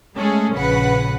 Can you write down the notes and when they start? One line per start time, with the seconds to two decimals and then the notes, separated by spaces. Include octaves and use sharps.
0.16 G#3 A3 C#4 G#4 A4
0.53 A#1 C#3 B4 F#5